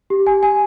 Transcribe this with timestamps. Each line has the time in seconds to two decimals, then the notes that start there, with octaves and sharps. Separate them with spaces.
0.10 G4
0.27 G#5
0.43 G#5